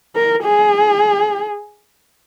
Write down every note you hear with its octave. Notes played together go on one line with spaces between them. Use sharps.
A#4
G#4